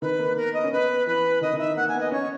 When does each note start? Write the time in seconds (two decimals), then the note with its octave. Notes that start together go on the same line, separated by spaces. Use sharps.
0.01 D#3 B4
0.19 A#3
0.36 B3 A#4
0.53 D#5
0.64 C#4
0.71 B3 B4
1.07 E3 B4
1.41 D#3 D#5
1.53 D#3
1.58 E5
1.76 A#3 F#5
1.88 G#5
1.95 B3
2.00 D#5
2.11 C#4 C#5